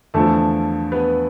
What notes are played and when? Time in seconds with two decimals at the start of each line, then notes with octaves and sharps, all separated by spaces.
0.14 E2 D3 F3 A3 A4
0.92 B3 B4